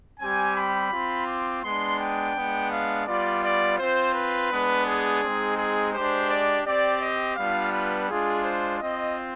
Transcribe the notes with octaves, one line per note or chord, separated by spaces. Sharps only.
G3 C4 G4 G#5
B5
C4 F4
D6
G#3 B3 D4 C6
G5
G#3 B3 D4
F5
G3 B3 F4 D5
D5
C4 F4 C5
B4
G#3 B3 D4
G#4
G#3 C4 D#4
G#4
G#3 D4 G4 C5
D5
C4 G4 D5
D#5
G3 B3 D4 F4 F5
B4
G#3 D4 F4 G#4
C5
C4 F4 D#5